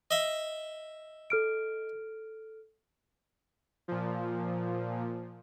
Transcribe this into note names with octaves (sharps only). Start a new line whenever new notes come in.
D#5 E5
A4 F6 D7
A#2 F3